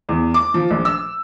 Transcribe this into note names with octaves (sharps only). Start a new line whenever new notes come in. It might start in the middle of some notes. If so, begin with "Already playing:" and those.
E2
D6
F3
A#1
E6